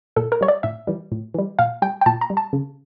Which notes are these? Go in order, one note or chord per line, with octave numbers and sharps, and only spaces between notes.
A#2 A4
A#4
G3 C#5
D5
A2 E5
E3 G3
A2
E3 G3
A#2 F5
G3 G5
G5
A#2 A5
A#5
G3
A5
C#3